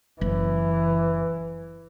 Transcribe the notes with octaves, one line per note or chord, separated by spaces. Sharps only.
F#1 E3